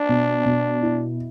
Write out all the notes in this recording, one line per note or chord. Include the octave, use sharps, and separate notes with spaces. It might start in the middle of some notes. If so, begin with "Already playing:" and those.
Already playing: D4
B2
B2
E4